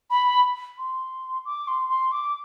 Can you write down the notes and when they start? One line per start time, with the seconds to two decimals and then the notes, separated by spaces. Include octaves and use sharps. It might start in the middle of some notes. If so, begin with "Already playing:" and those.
0.10 B5
0.78 C6
1.45 D6
1.68 C6
1.89 C6
2.12 D6